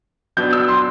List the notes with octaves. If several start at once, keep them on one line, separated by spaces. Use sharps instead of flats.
F#3 B3 D4 G6
E6
C6